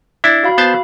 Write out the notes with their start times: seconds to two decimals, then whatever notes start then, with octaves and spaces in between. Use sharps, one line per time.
0.24 D4 E4
0.43 F#4 F5 B5
0.58 B3 C5 A5